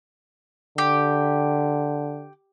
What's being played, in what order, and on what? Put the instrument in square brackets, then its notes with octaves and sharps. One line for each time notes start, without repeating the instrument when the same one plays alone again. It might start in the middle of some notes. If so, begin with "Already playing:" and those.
[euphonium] D3 [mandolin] G4